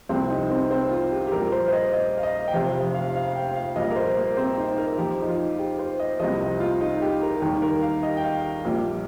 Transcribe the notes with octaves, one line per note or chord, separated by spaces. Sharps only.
C2 C3 F3 C4
D#4
C4
C4
F4
G4
G4
A#1 A#2 G3 A#4
C5
C5
D#5
D#5
F5
D#5
G5
F1 F2 C3 F3 F5
F5
F5
G5
F5
A#1 A#2 G3 D#5
A#4
C5
A#3
C4
D#4
A#4
F2 F3 G4
D#4
F4
G4
C5
D#5
C2 C3 F3 D#5
D#5
F4
D#4
G4
A#4
D#2 D#3 G3 G4
A#4
F5
D#5
G5
F5
A#1 A#2 G3